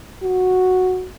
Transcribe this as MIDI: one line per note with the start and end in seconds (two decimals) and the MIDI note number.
0.24 1.09 66